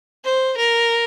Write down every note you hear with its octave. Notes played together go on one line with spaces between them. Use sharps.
C5
A#4